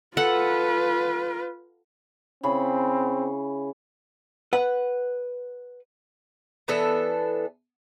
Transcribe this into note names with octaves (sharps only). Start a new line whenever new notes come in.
F4 A4 B4 F#5
C#3 C4 E4 B5
B4 F#5
E3 B3 D4 A4